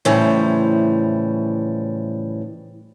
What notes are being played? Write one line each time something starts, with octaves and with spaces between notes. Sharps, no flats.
A2 C#3 E3 F3 G3